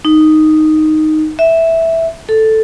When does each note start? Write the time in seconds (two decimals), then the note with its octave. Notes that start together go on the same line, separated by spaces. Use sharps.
0.05 D#4
1.39 E5
2.29 A4